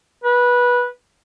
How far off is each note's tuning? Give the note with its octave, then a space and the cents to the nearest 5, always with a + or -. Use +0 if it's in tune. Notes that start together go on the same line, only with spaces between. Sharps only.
B4 -15